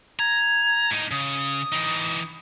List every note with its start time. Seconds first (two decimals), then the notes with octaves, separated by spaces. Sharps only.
0.19 A#5 G#6
0.91 A2 D#4
1.11 C#3 D#6
1.72 E3 D#4